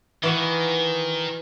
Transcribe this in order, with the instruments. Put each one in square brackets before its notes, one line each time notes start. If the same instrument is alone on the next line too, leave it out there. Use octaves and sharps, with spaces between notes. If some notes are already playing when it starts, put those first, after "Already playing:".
[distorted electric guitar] D#3 [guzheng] E3 F#4 F5